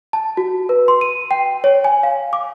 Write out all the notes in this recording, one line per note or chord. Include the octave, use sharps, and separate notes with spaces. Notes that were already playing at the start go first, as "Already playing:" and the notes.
A5
F#4
B4
C6
D#7
G5
C#5
G#5
F5
D6